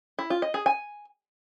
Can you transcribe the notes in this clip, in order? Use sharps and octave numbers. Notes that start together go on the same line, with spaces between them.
E4
F4
D#5
G#4
G#5